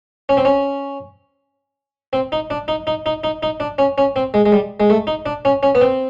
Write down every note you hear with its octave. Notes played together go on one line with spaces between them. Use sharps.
C#4
C4
C#4
C4
D#4
D4
D#4
D#4
D#4
D#4
D#4
D4
C#4
C#4
C4
G#3
G#3
G3
G#3
A3
D#4
D4
C#4
C#4
B3
C4